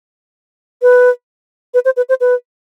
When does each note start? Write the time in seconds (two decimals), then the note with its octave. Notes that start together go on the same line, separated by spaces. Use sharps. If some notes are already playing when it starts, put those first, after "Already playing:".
0.82 B4
1.74 B4
1.85 C5
1.97 B4
2.09 C5
2.21 B4